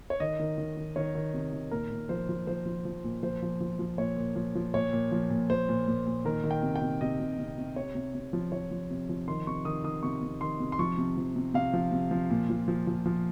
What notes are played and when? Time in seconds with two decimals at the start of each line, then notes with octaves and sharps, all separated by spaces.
0.10 C#5
0.20 D#3 D#5
0.39 D#3
0.58 D#3
0.77 D#3
0.96 D#3 C#5
1.15 D#3
1.34 C3
1.53 D#3
1.71 A#2 A#4
1.91 A#2
2.09 F3 C5
2.29 F3
2.47 F3 C5
2.66 F3
2.85 F3
3.04 A#2
3.23 F3 C5
3.42 F3
3.61 F3
3.79 F3
3.98 A#2 C#5
4.17 A#2
4.36 F3
4.55 F3
4.74 A#2 C#5
4.93 A#2
5.12 F3
5.30 A#2
5.49 A#2 C5
5.69 A#2
5.87 A#2
6.06 A#2
6.25 D#3 A#4
6.44 D#3
6.51 G5
6.63 C3
6.76 G5
6.82 C3
7.01 C3 D#5
7.20 C3
7.39 C3
7.58 C3
7.76 C3 C#5
7.95 C3
8.15 C3
8.33 F3
8.52 F3 C#5
8.71 F3
8.90 C3
9.09 F3
9.28 D#3 C6
9.47 C3 C#6
9.65 D#3 D#6
9.84 D#3 D#6
10.03 C3 C#6
10.22 C3
10.41 D#3 C6
10.60 C3
10.72 C6
10.79 F3 C#6
10.98 C3
11.17 F3
11.36 C3
11.54 C3 F5
11.73 F3
11.92 C3
12.11 F3
12.30 A#2
12.50 F3
12.68 F3
12.87 F3
13.06 F3